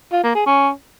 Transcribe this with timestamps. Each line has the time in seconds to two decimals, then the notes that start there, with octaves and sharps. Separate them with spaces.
0.12 F4
0.24 A#3
0.35 G#4
0.46 C#4